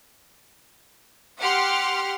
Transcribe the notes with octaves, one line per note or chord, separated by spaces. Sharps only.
G4 F#5 C6 F6